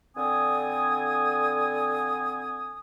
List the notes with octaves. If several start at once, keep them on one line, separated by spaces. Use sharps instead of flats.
D3 C4 G#5 D#6